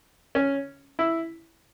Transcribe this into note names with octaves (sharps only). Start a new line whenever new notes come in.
C#4
E4